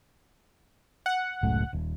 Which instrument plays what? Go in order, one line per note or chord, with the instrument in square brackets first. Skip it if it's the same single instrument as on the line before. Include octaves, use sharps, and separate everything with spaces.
[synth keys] F#5
[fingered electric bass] F#1 C#2 A2
D#1